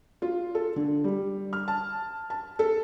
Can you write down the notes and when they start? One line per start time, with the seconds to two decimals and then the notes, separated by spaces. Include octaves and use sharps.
0.22 F4
0.55 A4
0.76 D3
1.04 G3
1.53 F6
1.68 A5
2.30 A5
2.59 A4